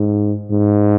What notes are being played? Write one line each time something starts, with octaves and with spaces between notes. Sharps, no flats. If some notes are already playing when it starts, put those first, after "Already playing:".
Already playing: G#2
G#2